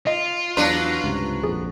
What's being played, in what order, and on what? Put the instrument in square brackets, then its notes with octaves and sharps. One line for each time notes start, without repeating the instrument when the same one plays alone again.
[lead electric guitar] F4 [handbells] D#5
[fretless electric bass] E2 [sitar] F#3 D4 B4 [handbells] C6
[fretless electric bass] C#2 G2 C3
[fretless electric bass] A#1 F2 [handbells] G#4